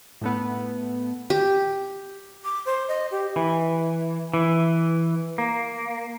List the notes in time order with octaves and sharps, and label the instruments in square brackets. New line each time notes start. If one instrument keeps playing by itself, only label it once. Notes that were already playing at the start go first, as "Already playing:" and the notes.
[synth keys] A2 A3 B3
[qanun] G4
[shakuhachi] D6
C5
D#5
G4
[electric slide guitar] E3
E3
A#3